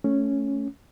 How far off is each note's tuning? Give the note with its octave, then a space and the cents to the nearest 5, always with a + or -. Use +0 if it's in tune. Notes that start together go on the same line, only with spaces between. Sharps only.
A3 +0 C#4 +0